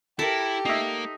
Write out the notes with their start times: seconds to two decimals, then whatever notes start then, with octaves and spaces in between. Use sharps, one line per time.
0.19 E4 G4 A4 A#4
0.65 A#3 D#4 E5